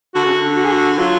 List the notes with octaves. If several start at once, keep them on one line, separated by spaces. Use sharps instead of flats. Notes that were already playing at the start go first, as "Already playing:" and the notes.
D3 F#4
C#3
D3
F#4
G#4
F#4
F#3 F4